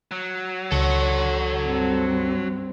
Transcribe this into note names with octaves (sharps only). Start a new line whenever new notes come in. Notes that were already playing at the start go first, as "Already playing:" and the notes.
F#3
C#2 A4 C#5 F#5
G2 C4